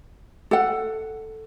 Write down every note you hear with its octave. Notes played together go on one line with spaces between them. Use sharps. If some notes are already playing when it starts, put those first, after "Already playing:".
A4 F#5